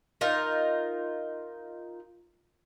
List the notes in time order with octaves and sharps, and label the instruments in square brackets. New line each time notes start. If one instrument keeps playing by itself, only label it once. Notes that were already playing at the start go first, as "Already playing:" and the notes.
[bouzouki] D#4 F4 A#4